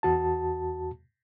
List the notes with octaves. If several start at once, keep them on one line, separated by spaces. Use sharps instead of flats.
E2 F#4 A5